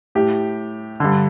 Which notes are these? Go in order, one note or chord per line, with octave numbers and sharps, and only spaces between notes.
A2 G4
G2 D3